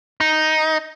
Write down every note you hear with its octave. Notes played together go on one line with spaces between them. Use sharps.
D#4